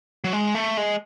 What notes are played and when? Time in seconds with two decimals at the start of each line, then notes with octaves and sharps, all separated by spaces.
0.24 F#3
0.33 G#3
0.55 A3
0.77 G#3